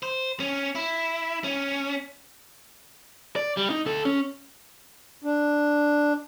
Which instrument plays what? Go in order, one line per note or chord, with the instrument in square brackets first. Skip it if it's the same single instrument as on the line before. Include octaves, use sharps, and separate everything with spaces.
[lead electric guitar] C5
C#4
E4
C#4
[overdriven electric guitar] D5
G3
D#4
D2 A4
C#4
[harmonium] D4